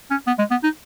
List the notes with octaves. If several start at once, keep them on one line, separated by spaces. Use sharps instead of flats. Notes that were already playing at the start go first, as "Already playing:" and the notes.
C#4
B3
G#3
B3
D#4